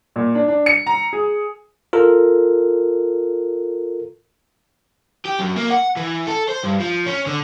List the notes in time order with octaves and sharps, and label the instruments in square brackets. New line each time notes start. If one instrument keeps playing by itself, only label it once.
[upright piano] A#2
D4
D4
C#7
A#5
G#4
[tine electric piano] F4 A4 A#4
[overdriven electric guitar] G4
F#2
A#3
F#5
E3
A4
C5
G2
F3
C#4
D3